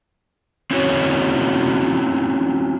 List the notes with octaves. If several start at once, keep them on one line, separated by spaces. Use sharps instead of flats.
C4 C#4 E4 F#4 C#5